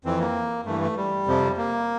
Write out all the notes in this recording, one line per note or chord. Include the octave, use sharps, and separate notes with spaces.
F2 E3 C4
A#3
G2 E3 A3
A3
G3
F2 C3 F3
A#3